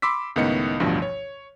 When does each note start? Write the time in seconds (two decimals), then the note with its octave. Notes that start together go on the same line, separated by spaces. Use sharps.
0.02 B5 C6 D6 E6 B6
0.36 C#2 A2 D#3 B3 D#5 C#7
0.80 A1 D2 G2 B2 F3
1.02 C#5